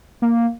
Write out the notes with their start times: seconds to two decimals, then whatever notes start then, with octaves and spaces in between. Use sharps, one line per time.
0.22 A#3